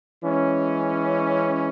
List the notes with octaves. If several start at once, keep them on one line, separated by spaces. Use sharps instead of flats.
E3 G#3 C#4